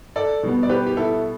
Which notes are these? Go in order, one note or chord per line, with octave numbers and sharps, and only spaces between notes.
A4 D5
B2 G3 B3
D5
G4 B4
G4
E4 A4